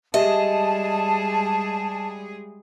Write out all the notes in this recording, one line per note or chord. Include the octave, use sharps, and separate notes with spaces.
G3 G#3 G4 G#4 D#5 E5 A5